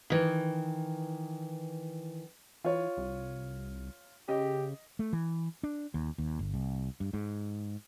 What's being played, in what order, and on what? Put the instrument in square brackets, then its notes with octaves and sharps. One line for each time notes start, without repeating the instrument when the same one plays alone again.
[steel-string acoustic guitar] D#3 E3
[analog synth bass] E3 [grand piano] F4 C#5
[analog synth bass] C2
[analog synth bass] C#3 [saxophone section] G4 [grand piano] D#5
[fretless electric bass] A3
E3
D4
D#2
D#2
G1
C2
G2
G#2